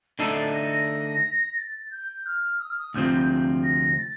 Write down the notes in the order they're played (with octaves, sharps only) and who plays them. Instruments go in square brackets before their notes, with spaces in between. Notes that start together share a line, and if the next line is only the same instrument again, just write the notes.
[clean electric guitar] D3 A3 D#4 A4 [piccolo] C7
[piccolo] A6
A#6
A#6
A6
G6
F6
D#6
F6
D#6
[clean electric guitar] D2 C3 F3 C4 [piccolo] G6
[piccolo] A#6
A6